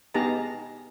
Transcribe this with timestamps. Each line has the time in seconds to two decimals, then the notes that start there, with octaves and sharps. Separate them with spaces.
0.14 B3 D#4 G4 G#4 A5 A#5